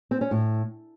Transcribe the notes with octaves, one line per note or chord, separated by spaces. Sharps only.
C4
C#4
A2